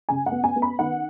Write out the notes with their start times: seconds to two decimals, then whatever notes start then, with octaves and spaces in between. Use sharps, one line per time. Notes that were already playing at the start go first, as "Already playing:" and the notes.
0.09 C#3 G#5
0.26 F#5
0.32 B3
0.44 G#5
0.56 B3
0.62 B5
0.79 D#3 F#5